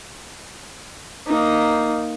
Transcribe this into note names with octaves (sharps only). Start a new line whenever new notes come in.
A#3 D#4